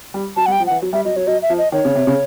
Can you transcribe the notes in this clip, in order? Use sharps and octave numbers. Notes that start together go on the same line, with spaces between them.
G3
F#3 A5
G3 F#5
G5
F3
E3 F#5
F#3
G3 E5
F#3 D#5
F#3 C#5
F#3 D#5
E5
F3
D#5
D#3 C#5
C#3
C3
C#3